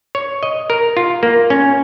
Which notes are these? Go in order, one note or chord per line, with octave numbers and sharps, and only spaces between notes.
C#5
D#5
A#4
F4
A#3
C#4